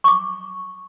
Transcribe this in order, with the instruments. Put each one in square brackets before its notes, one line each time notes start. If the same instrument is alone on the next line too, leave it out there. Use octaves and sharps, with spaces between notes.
[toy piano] C#6 D6